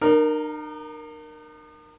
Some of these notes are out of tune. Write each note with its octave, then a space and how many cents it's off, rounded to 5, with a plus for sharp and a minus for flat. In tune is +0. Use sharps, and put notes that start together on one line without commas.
D#4 -45 A#4 +0